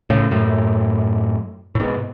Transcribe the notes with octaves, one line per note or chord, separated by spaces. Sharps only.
A2 C#3
F#2 A2
A2
G#2 B2